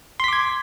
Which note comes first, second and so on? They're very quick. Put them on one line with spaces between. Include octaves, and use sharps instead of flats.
C6 B6 D6 G#6